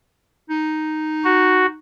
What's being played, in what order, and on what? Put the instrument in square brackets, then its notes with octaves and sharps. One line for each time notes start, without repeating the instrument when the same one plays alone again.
[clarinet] D#4
[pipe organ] F#4